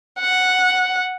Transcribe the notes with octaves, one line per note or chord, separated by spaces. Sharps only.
F#5